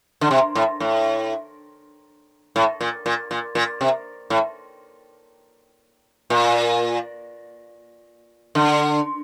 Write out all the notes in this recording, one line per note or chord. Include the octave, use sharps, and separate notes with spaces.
D3
C3
A2
A2
A2
A#2
A#2
A#2
A#2
C3
A2
A#2
D3